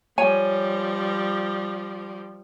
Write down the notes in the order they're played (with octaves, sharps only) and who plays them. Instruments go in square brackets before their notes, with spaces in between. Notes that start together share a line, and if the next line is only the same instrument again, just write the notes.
[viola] F3 G3 [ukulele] C#5 G#5